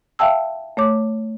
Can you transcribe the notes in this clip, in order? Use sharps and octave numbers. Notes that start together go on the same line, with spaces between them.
E5 F5 G5 A5 E6
A3 C#5 D6